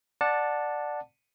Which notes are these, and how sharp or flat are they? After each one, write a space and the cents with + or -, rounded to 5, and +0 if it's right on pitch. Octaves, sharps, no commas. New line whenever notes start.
D5 +10 F#5 -15 A5 +0